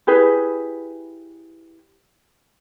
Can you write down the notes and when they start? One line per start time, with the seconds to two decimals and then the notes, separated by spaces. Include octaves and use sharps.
0.07 E4 G4 G#4 B4